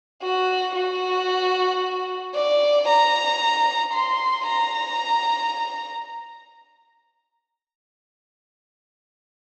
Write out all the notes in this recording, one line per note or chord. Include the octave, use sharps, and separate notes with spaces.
F#4
F#4
D5
A#5
C6
A#5